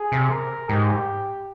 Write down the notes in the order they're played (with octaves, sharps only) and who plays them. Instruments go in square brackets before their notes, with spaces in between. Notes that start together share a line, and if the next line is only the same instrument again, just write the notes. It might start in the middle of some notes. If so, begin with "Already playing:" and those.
Already playing: [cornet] G#4
[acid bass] C3
[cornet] A#4
[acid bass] G#2 [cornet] G4